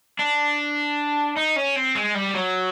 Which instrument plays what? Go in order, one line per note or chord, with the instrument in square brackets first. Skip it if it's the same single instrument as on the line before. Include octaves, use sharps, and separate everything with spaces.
[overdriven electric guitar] D4
D#4
C#4
C4
G#3
G3
F#3